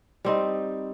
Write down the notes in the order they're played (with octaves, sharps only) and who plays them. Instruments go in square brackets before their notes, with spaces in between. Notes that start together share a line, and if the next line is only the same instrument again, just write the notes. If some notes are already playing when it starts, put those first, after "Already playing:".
[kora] G3 C4 D#4